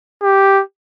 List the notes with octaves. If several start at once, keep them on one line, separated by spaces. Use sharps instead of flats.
G4